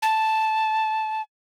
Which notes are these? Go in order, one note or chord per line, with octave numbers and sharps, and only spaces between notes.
A5